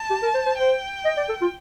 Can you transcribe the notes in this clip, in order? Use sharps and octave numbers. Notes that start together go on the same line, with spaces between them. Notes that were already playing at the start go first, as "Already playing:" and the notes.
Already playing: A5
G4
A#4
C5
C5
C5 G5
D#5
D5
A4
F4